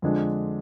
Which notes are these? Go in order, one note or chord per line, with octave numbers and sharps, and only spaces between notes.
F2 D3 G#3 D4